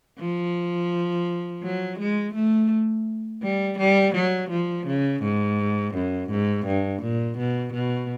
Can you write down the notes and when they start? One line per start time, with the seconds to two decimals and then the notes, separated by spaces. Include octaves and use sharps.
0.20 F3
1.63 F#3
2.00 G#3
2.35 A3
3.43 G3
3.79 G3
4.15 F#3
4.51 F3
4.87 C#3
5.23 G#2
5.95 F#2
6.30 G#2
6.67 G2
7.03 A#2
7.39 B2
7.74 B2